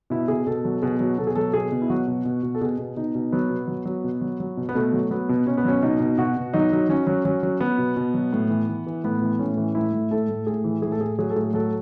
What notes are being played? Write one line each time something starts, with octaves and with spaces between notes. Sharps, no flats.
B2 E4
B2 G#4
B2 A4
F#3
B2 G#4
F#3
B2 A4
G#4
F#3 A4
B2 G#4
B2
E4
F#3 F#4
B2
B2
B2
A4
B2 G#4
B2
B2 D#4
B2
F#3 B3
B2
F#3
F#3
B2
F#3
F#3
B2
B3
B2 A3
F#3
F#3 B3
B2
B2 C#4
B3
F#3 C#4
B2 D#4
B2
B2 F#4
B2
F#3 D#4
F#3
F#3 C#4
F#3
F#3 C#4
F#3
F#3 B3
B2
B2
F#3
A2
E3
E3
E3
A2 B3
E3
A2 C#4
E3
A2 E4
A2
A2 A4
A2
A2 G#4
E3
A2 G#4
A4
A2 G#4
F#3 G#4
A4
A2 G#4
F#3 A4